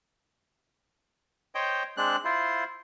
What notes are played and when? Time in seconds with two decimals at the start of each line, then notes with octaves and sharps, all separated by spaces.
1.55 C5 C#5 D#5 G5
1.97 G#3 C4 D4 F#6
2.25 E4 F4 C5